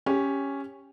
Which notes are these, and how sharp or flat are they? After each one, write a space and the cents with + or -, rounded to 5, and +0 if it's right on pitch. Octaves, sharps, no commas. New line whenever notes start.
C#4 +0 G4 +10